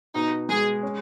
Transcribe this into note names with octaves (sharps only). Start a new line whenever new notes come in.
B2 D#4
G#3 G#4
C#4